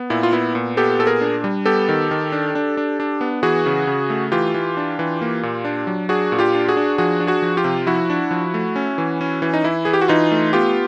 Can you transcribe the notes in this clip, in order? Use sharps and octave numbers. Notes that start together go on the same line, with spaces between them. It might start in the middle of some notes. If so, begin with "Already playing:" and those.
Already playing: B3
A#2 E4
F4
B3 E4
A#2
B3 G4 A4
A#2 A4
G#4 A#4
D4
G3
B3 G4 A4
D#3
D#3
D4
D4
D4
D4
B3
E3 F#4 G#4
C#3
C#3
A3
E3 F4 G4
E3
D4
E3
A#3
A#2
D4
F#3
D4 F#4 G#4
A#2
F4 G4
D4
F#4 G#4
D4
F3 F#4 G#4
D4
F#4 G#4
F3
F4 G4
C3
F3 E4 F#4
D4
F3
A3
C#4
E3
C#4
E3
D#4
E3 E4
E3 G#4
G4
F#4
E3 D#4 F4
A3
B3 F4 G4